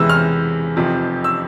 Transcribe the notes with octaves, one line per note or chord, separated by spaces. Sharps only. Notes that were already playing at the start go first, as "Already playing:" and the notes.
Already playing: E2 C3 E3 G#3 E6
F6
F1 F2 C3 F3
E6